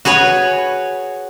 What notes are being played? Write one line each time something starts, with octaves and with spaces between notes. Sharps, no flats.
F#4 G#4 B4 C#5